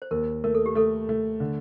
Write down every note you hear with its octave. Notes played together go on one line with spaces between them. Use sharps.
C5
D#2 A#4
A3 A#4
A4
G4
A3 A4
A3
D3